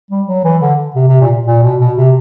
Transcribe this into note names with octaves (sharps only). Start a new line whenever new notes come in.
G3
F#3
E3
D3
C3
C3
A#2
A#2
B2
B2
C3